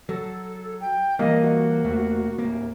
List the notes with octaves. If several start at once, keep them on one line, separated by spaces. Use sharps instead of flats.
F#3 A4
G5
E3 G3 A#3 D#5
F#4
E1 E2 A3
D1 A#3